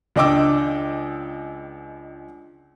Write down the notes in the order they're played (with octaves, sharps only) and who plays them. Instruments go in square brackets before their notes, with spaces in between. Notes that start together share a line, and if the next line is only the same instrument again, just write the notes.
[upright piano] C#2 D4 D#5 G5 D6 E6